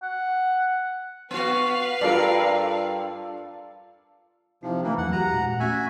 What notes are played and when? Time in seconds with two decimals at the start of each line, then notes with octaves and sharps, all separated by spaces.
0.03 F#5
1.31 B3 F#4 B4 F5
2.01 G2 F4 A4 A#4 D5
4.63 C3 F3 D#4 E4
4.83 E3 A3 A#3 D4
4.98 E2 E3 F#3 F#5
5.12 G#3 F#4 G4 F#5 A#5
5.33 A#2
5.60 A3 C#4 F#4 E5 G#5